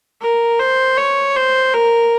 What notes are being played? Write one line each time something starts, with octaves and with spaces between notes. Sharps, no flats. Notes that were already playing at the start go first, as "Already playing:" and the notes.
A#4
C5
C#5
C5
A#4